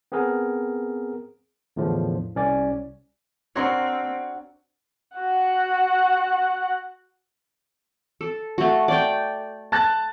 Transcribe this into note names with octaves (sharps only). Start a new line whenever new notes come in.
B3 C4 G#4 A#4
E2 A2 D3 F3
C2 C#4 D5 G#5
C4 D4 F#4 A#4 C#5 C6
F#4 F#5
A4
A3 F#4
D5 G5
A5 F#6 A6